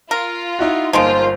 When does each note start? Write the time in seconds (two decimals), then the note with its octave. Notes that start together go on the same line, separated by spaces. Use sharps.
0.11 F4 A#4
0.59 D#4 E4 F#4
0.93 G1 F3 G#3 A#3 D#4 F4 C5 D7